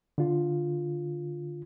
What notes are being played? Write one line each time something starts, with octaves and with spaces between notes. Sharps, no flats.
D3 F4